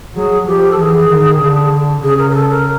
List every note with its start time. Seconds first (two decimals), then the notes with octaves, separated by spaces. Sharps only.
0.15 F#3 G#4
0.46 F3 G4
0.71 A4
0.78 E3 G#4
1.09 D#3
1.40 D3
2.03 C#3 G#4
2.18 A#4
2.30 A#4
2.34 A4
2.49 A#4